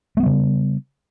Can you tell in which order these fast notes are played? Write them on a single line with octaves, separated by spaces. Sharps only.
A3 B3 G3 C#3